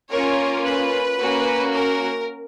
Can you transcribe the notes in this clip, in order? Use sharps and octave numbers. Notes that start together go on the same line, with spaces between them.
A#3 C#4 F4 A#4 C#5
B4
A#3 C#4 F#4
A#4